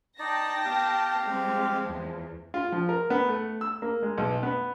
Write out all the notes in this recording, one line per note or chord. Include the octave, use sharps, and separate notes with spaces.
D#4 D5 G5 A5 A#6
B3 G4 F5
F3 G3 G#3 C4
E2
F4
F3
A#4
B3
A3
E6
A#3
G#3
B1
B3